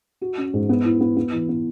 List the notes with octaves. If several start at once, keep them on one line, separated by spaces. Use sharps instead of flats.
F#4
C#4
G#2
B3
E4
B3
B3
E3
B3